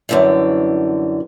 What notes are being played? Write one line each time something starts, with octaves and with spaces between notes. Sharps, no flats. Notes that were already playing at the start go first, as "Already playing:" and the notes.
F#2 A2 D3 E3 G3